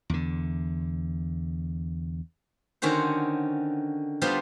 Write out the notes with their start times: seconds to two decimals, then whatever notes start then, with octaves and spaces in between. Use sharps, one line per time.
0.10 E2 D3
2.82 D3 D#3 C#4 F#4 C5
4.22 G3 B3 D4 F4 C5